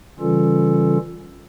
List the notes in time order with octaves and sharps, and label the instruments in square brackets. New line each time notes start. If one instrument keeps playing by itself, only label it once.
[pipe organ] C#3 E3 G3 C#4 F4 A4